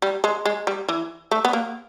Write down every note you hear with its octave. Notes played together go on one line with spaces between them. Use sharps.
G3
G#3
G#3
G3
E3
A3
B3
A#3